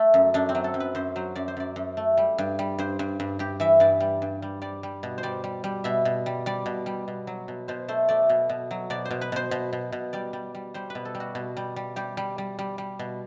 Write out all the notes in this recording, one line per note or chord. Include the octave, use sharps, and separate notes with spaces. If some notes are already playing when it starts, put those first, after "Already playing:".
Already playing: A3
F#2
F#2 D4
C4
F#3
A4
F#2
B4
F#2 C5
F#3 C5
F#2 D5
C5
F#2 D5
F#2
A3
G3
G2
G3
G2 C5
G2
G2
G2 G4
E3 E5
G2 D5
G3
G2
G3
G3 D5
G3
B2
C5
G3 D5
G3
G3
B2 E5
B2
G3
G3 D5
B2
G3
B2
F#3
B2
B2 C5
A3 C5
A3 D5
B2
B2
F#3
B2 D5
C5
B2
B4
B2 C5
B2
B2
B2
G3 D5
G3
G3
G3 C5
B4
B2
A4
G3
F#4
B2
G3
G3
G3 G4
G3
G3
G3
G3
B2